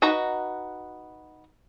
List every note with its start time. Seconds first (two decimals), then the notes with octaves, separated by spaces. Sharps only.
0.02 D#4 F#4 B4 A#5